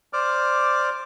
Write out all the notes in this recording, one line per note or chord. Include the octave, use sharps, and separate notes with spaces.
C5 D5 D6 F6